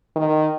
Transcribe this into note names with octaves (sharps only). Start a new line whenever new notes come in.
D#3